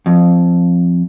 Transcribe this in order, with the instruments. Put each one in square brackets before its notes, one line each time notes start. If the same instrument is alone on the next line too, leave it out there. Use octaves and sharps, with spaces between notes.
[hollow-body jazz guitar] F2